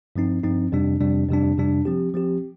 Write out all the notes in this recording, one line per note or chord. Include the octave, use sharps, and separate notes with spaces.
G2 F3 C4 D#4
G2 F3 C4 D#4
F2 C3 G3 D4
F2 C3 G3 D4
F2 C3 G3 D4
F2 C3 G3 D4
F3 C4 G4
F3 C4 G4